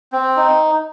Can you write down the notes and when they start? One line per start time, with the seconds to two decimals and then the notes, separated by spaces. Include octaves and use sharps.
0.12 C4
0.37 D#4